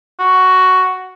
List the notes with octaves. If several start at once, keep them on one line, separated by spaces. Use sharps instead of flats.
F#4